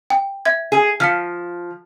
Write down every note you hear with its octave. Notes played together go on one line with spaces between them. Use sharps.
G5
E5 G#6
G#4
F3 F6 B6 C#7